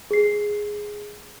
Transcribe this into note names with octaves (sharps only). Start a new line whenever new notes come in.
G#4 C7